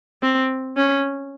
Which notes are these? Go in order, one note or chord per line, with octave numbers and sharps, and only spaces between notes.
C4
C#4